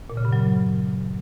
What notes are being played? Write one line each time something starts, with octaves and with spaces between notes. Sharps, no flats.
A#2
C#3
G2
F#3